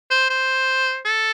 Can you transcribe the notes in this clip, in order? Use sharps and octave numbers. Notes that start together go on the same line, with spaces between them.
C5
C5
A4